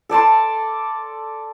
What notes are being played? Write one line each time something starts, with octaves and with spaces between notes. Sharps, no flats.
A4 D5 A5 C6